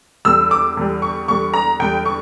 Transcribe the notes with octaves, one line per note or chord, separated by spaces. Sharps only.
E2 D3 G3 E6
D6
E2 D3 G3
C#6
E2 D3 G3 C#6
A#5
E2 D3 G3 G5
C#6